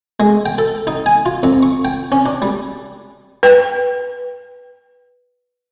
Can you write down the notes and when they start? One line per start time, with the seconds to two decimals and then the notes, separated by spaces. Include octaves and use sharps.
0.20 G#3
0.46 G5
0.58 A4
0.87 D#4
1.06 G#5
1.26 F4
1.43 F2
1.63 C#6
1.85 G5
2.12 C#4
2.26 D4
2.42 G3
3.43 B4 G5